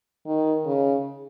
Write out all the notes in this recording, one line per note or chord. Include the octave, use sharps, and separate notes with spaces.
D#3
C#3